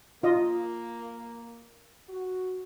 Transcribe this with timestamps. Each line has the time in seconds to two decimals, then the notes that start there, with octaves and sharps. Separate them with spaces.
0.23 A#3 F4 D#5
2.09 F#4